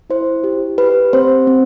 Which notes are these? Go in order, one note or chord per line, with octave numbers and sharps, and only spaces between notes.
E4 C5
G4
G4 B4
C4 C5
C4